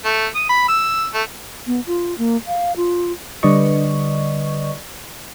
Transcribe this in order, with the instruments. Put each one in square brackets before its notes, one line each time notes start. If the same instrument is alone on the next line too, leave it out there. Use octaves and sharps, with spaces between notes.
[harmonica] A3
D#6
B5
E6
A3
[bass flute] B3
F4
A#3
F5
F4
[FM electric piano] D3 G3 B4 D5 D#5 C#6